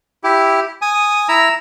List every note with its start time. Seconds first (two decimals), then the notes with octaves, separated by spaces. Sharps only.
0.24 E4 G4
0.82 G#5 D#6
1.29 E4 A#5 E6